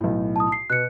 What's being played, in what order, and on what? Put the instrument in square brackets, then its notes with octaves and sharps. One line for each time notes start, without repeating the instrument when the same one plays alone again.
[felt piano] B1 A2
[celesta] A5 D#6
C7
[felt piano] B2 [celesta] F#6 C#7